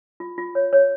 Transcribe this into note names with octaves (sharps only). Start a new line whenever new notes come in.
F4
F4
C#5
C#5